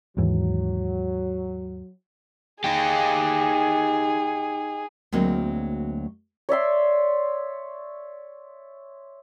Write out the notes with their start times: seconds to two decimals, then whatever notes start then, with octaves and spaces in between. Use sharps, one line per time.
0.17 D#2 G#2 E3 F#3
2.64 D#4 G4 G#4
5.12 D2 F#3 G#3 A#3 C4
6.49 C#5 D5 E5 C6